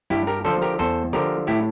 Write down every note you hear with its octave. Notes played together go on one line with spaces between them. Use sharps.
G2 E4 G4
G4 A#4
D3 F3 A4 C5
G4 A#4
E2 A4 C5
D3 F3 G4 A#4
A2 E4 G4